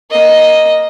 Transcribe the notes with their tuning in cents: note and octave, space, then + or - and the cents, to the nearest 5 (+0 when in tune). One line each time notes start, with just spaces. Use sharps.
A#3 +10 D#5 +0